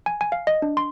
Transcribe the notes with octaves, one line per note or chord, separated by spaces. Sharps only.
G#5
G#5
F5
D#5
D4
C6